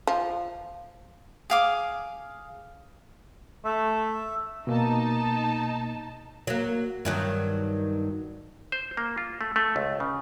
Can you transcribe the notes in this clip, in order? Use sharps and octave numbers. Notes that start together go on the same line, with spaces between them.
F3
G#4 F5 D6
A3 E5
B2 A#3 D#4 A5
F#3 A#3
G2 D#3 F#3
C5
A#3
F4
A3
A3
C#2
C#3